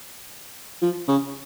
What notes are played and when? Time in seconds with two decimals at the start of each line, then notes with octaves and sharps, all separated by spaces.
0.82 F3
1.08 C#3